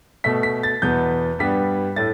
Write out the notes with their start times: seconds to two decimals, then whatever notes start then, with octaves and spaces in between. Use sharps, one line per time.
0.24 B2 A3 B6
0.43 B6
0.63 A6
0.82 E2 B2 B3 G6
1.39 G2 G3 B3 B6
1.96 A2 A3 A6